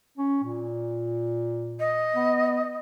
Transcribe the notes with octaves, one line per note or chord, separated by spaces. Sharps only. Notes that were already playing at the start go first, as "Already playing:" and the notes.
C#4
A#2
D#5
B3